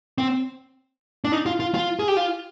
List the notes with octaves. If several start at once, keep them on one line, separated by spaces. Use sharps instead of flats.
C4
D4
D#4
F4
F4
F4
G#4
G4
F4